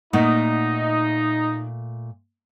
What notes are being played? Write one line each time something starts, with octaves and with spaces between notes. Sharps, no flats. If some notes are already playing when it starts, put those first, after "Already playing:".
A#2 A3 D#4 F#5